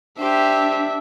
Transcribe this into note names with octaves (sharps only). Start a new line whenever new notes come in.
D4 G4 C5 E5